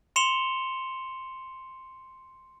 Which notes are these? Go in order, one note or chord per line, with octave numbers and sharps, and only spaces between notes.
C6 C#7 E7 F7 G7